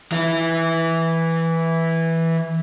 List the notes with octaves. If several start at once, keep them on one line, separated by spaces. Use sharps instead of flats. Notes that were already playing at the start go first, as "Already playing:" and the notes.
E3 E4